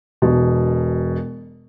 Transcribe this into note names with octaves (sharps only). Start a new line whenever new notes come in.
E1 B2